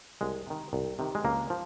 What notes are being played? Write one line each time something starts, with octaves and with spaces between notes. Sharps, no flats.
C2 G#3
C3 D#3
C2
C3 D#3
G#3
C#2 A#3
F3